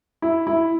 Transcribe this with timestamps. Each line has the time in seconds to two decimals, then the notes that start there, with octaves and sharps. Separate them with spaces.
0.22 E4
0.47 E4